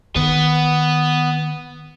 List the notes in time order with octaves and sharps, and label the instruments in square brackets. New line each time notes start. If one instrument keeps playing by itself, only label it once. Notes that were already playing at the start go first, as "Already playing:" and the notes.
[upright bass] D#3 [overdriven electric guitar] B3